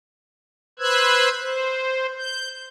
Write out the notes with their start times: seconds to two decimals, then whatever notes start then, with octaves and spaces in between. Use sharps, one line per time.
0.79 B4 C5 E6 F#6 G#6
1.41 C5
2.18 G6